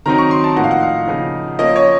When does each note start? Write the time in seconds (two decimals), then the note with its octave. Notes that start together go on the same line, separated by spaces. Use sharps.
0.06 D#3 F#3 C4 D#4 A#5
0.18 C#6
0.31 C6
0.44 A5
0.56 A2 F3 A#3 D#4 F#5
0.64 F5
0.71 F#5
0.83 F5
1.07 C#3 F3 A#3 D#4
1.59 F3 A#3 C#4 D#5
1.76 C#5